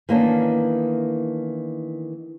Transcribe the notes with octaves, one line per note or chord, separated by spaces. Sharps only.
D#3 E3 A#3 B3 C#4 D4